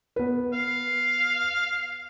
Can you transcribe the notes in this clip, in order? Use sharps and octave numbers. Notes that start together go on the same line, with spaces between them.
B3 B4
F5